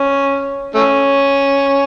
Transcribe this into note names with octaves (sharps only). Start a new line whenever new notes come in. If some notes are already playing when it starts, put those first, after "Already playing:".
Already playing: C#4
A3 C#4